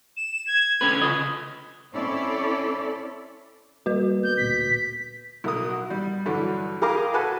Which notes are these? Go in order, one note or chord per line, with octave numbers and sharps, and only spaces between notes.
E7
G#6
D3 C#4 B4
C#3 F4 D#5
C4 C#4 E4 A4 C#5 D5
G3 A#3 F#4 B4
A#3 B3 G6
D2 A#2 B6
B1 A#4 D#6
F#4
G3
G2 D3 E3 F#3
G4 G#4 A#4 F5 A#5 D6
F#4 A4 B4 G#5 A5 F#6